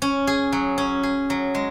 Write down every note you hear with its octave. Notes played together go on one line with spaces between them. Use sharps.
C#4
G#4
F#3
C#4
G#4
F#3
G#3